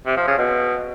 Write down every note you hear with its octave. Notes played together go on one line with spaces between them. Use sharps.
C3
F3
C#3
B2